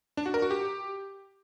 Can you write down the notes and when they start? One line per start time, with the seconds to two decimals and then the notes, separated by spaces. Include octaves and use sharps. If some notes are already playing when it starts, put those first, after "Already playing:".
0.17 D4
0.26 F#4
0.34 A#4
0.42 F#4
0.50 G4